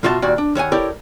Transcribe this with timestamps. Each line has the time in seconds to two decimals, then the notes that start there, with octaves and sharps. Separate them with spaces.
0.03 F#2 B2 F4 F#4 E5 A5
0.22 D#2 A#2 F#4 D5
0.38 D4
0.55 D#2 C#5 F#5 G#5
0.72 E4 G4 A4 A#4 C#5 D5